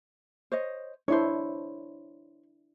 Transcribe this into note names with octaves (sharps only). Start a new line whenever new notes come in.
C5 C#5 D#5
D4 E4 C5 C#5